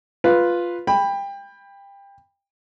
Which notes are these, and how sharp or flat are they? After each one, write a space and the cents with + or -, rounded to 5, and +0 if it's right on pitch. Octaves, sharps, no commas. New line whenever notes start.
F4 +0 B4 +0
G5 +25 B5 +0